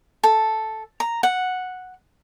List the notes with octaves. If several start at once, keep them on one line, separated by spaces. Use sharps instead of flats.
A4
A#5
F#5